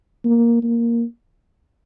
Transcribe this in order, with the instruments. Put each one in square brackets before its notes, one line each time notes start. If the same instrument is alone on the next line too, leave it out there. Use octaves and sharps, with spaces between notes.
[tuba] A#3
A#3